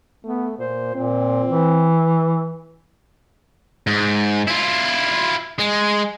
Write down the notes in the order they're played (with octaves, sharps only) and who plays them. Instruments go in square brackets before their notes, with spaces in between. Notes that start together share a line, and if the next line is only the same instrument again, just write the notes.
[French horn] A3 [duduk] B3
[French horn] A#2 [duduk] C5
[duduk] A#2 [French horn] C4
[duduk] E3
[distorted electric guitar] G#2
E4 F4
G#3